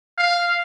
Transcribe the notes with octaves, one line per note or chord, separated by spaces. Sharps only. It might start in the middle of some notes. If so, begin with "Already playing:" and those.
F5